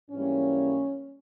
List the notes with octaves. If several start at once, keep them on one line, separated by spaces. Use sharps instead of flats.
G#2 E3 G3 A#3 C#4